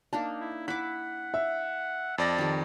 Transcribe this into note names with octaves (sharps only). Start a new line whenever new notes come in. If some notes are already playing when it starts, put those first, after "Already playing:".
A#3 D4 D#4 A5
E4
E4 F#5 D6 B6
E5
F2 D5 A5 A#6
D#3 G4